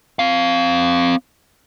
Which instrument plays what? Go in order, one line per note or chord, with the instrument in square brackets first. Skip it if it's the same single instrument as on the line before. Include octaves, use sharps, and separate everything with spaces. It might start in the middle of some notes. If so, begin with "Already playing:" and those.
[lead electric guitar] C4 F5